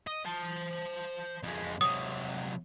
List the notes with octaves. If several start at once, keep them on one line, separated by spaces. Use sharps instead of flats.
D#5
C5 A5
F2 G#3
C3 F#3 D#6